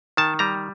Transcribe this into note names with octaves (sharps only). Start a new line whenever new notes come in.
D#3 A5
G3 A#5